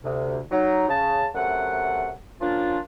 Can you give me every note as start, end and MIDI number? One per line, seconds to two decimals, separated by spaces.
0.03 0.38 38
0.03 0.38 48
0.51 0.84 54
0.51 0.84 63
0.88 1.26 49
0.88 1.26 81
1.34 2.10 42
1.34 2.10 48
1.34 2.10 57
1.34 2.10 78
2.40 2.78 53
2.40 2.78 58
2.40 2.78 61
2.40 2.78 62
2.40 2.78 65